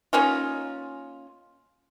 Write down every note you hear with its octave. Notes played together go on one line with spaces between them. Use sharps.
A#3 C#4 D#4 F4